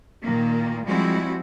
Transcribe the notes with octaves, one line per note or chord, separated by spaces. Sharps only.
A#2 D#3 A#3
F3 G3 G#3 C4 E4 F#4